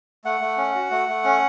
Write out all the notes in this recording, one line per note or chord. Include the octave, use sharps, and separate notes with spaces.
A3 F#5
A3
C#4
F#4
A3
A3
C#4